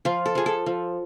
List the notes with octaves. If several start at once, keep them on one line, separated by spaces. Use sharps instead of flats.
F3 F4
A4
F3 G#4
A4
F3